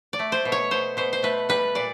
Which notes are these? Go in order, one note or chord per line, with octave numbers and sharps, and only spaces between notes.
D5
A3
C5
B2
C#5
B2 C5
B2 C5
C5
A3 B4
G3 B4
A#2 D5